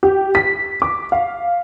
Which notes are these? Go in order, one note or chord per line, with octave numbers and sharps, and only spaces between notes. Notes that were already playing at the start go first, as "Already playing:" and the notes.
G4
B6
D6
F5